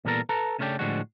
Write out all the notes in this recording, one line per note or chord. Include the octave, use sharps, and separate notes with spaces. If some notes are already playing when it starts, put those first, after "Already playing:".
A#2 E3 G3 B3 A4 A#4
A4 B4 A5 A#5
C#3 A3 C#4 D4 E4 G4
A2 D3 F3 G3 G#3 F#4